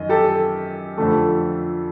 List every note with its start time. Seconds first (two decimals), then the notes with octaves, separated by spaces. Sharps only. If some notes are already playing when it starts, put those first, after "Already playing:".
Already playing: F#2 D#3 D#5
0.09 G4 A4
0.97 F2 D3 F3 A3